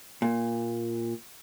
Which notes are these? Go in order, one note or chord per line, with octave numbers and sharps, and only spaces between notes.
A#2